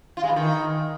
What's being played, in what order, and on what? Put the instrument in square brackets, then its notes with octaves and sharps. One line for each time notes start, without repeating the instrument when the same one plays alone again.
[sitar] F4
G#3
E3
D#3